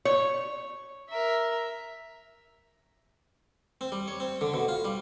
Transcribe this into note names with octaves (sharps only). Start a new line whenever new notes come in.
C#5
A#4 E5
C4
G3
C#5
C4
D3
B2
F4
G3